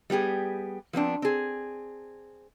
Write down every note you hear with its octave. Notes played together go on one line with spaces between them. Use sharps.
G3 B3 G4 G#4
F3 B3 C4 D4
C4 G#4